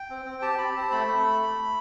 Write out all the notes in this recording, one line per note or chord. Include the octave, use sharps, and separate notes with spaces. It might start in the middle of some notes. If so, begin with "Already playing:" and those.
Already playing: G5
C4
C4
G4 A5
G4 B5
C4 A5
A3 B5
A3